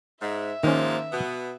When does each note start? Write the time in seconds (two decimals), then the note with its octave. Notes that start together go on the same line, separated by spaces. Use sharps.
0.21 G#2 E5
0.63 G#2 D#3 F3 A#3 C#4
1.12 B2 B3